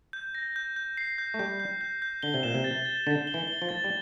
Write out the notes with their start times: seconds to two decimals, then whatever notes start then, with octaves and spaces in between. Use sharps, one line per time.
0.13 G6
0.35 A#6
0.56 G6
0.76 G6
0.97 C7
1.18 G6
1.34 A3
1.39 G3 G6
1.60 G6
1.81 G6
2.02 G6
2.23 D3 G7
2.34 C3
2.43 A#2 E7
2.55 C3
2.64 A6
2.85 A6
3.06 D3 A6
3.27 G7
3.34 E3
3.48 G7
3.62 F3
3.69 A6
3.84 G3